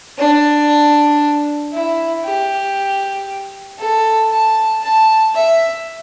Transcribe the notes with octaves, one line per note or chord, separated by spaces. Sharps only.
D4
E4
G4
A4
A5
A5
E5